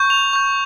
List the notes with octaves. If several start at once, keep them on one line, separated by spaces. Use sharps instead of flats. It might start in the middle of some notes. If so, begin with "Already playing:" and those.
Already playing: C#6 G6
F7
C#6 G6